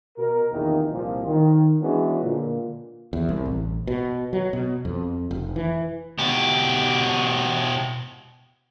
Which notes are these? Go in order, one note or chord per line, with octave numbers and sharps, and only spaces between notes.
B2 A#4
A#1 E2 C3 D#3 A#3 D#4
C2 A#2 F3
D#3
E3 G#3 B3 C#4 D4 F#4
A#2 D3 A#3
E2
C2
A1
B2
F#3
B2
F2
F1
E3
B2 G4